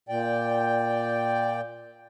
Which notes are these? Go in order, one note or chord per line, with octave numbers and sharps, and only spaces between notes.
A#2 D5 G5